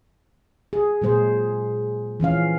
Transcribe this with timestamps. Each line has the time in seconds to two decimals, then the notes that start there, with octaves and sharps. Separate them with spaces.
0.73 G#4
1.01 A#2 F#3 G#3 G#4 C5
2.20 E3 F3 C#4 F5